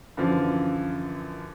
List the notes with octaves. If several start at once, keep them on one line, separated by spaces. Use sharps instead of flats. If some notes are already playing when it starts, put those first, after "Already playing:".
F#2 D3 E3 F3